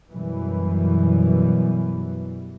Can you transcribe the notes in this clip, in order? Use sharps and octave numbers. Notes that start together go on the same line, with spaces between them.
F#2 B2 E3 G3